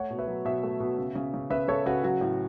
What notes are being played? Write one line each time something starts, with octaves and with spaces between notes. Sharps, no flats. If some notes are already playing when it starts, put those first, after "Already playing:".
Already playing: A3 C#5 F#5
B2
B4 E5
F#3
B2 B4 E5
A3
B2
C#3
C#3
C#3
C#3 B4 E5
C#3 A4 C#5
C#3 F#4 B4
F#3 F#4
A2